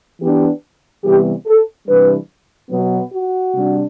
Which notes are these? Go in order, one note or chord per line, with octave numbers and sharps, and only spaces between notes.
E3 B3 D4 G4
C3 E3 G3 B3 G4
A4
C3 E3 G3 D4 B4
B2 F#3 B3
F#4
C3 G3 D4